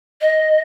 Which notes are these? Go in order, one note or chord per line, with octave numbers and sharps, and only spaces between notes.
D#5